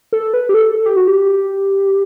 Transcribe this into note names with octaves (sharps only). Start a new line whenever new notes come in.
A4
B4
G4
A4
A4
G4
F#4
G4